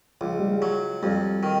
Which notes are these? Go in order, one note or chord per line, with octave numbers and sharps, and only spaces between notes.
C#2 F3
G3
G#3
F#3
F2 G3
D#3